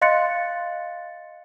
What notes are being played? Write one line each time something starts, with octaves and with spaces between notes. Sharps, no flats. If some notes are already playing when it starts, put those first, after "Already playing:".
D#5 F5 C6 F#6 A6 C#7